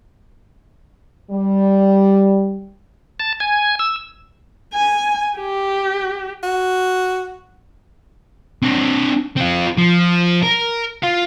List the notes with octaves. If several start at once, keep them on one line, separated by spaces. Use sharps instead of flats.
G3
A5
G#5
E6
G#5
G4
F#4
C4 D4
C4 F4
F3
A#4
F4 F5